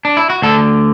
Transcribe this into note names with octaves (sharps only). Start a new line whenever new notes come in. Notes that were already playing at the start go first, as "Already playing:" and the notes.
D4
E4
F#4
D2 D3 A4